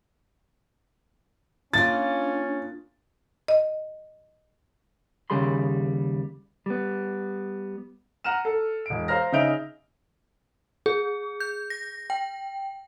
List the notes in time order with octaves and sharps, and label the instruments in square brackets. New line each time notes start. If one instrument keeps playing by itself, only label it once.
[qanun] A#3 F4 [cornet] C#4 [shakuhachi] D4 [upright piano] A6
[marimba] D#5
[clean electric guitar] D#2 C#3 G3 G#4 B5 C6
G3 B3
[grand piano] F#5 A#5 F6 D#7 E7
A4
E1 D7
C5 F5 A#5 F6 A#6
C#3 D#4 E5 G6 D7 F7
[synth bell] G#4
G6
A#6
G5